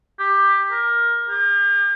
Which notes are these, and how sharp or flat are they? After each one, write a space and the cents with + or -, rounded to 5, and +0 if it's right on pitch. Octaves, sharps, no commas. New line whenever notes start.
G4 +15
A#4 +15
G4 +45